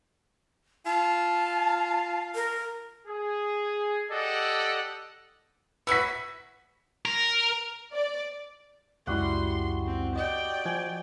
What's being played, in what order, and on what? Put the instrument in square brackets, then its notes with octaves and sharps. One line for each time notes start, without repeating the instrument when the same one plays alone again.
[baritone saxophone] F4 [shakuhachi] A5
[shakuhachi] A#4
[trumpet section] G#4
G4 A4 D5 D#5 F#5
[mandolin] B3 E4 F#4 [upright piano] E6 B6
[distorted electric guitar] A#4
[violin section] D5
[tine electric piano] C#2 F#2 E4 [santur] G3 F#4 F#5 [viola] C6
[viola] C4
[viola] D5 G5 [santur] D#5
[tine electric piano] F3 [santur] G#5